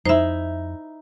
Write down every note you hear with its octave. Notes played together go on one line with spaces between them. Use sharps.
F2 D#4 E4 C5 E5